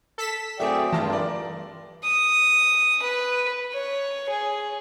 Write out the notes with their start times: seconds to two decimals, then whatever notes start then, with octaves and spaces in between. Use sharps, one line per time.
0.18 A4 B6 E7
0.60 F#3 A3 C4 G#4 D5 E5 G5
0.92 G2 E3 A3 F4 A5 A#6
1.10 A#4 D5
2.04 D#6
3.02 B4
3.73 C#5
4.30 G#4